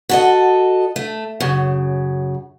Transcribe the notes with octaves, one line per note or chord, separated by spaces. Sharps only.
F#4 A4 D#5
A3
F#2 C#3